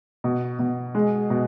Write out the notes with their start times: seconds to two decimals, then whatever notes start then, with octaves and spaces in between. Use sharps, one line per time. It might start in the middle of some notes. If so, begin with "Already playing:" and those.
0.24 B2
0.59 B2
0.95 G#3
1.30 B2